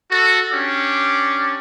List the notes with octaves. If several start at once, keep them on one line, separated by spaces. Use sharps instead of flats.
F#4 A4
C#4 D4 G4 D5